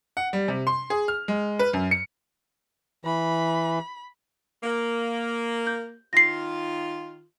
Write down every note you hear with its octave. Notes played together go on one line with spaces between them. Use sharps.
F#5
G3
C3
C6
G#4
F6
G#3
B4
F#2
C#7
E3 B5
A#3
G6
D#3 F4 A#6 C7